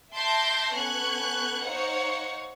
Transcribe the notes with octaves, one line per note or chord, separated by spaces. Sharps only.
E5 A5 C6 D6 G6 A#6
B3 C#4 A4 C#6 F#6 G#6
D#4 C5 C#5 F5 F#5 C#7